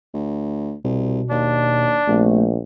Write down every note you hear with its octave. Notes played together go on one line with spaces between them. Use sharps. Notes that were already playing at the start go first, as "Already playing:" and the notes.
D2
C2 B2
D#2 D4
A#1 C3 A3